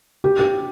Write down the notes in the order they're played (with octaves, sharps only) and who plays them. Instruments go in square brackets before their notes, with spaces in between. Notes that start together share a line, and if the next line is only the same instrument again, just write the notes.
[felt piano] G4
G4